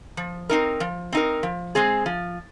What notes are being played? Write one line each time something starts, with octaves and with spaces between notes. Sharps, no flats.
F3
C4 D#4 A#4
F3
C4 D#4 A#4
F3
G#3 C4 G#4
F3